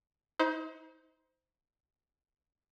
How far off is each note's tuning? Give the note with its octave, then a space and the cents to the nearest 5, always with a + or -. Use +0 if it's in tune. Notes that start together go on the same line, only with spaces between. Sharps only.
D#4 +40 C5 -15